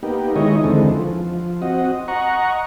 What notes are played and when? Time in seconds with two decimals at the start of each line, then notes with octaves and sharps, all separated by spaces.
0.03 A#3 B3 D#4 G4
0.36 D#3 G#3 D#4 E4 C#5 D#5
0.64 D#2 D3 E3 G#3 C4 A4
0.89 F3
1.62 C4 F#4 D#5
2.08 D#5 F#5 A#5 C#6